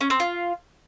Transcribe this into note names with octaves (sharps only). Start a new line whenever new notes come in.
C#4
C4
F4